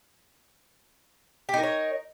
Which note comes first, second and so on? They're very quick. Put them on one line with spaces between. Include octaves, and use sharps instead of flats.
G4 D#4 A#4 C#5